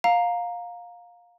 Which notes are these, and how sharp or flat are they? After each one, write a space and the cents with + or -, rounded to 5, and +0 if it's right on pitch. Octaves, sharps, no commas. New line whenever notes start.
F5 +15 A#5 +0